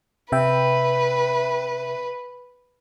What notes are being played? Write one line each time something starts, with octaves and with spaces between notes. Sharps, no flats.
C3 B4 E5 G5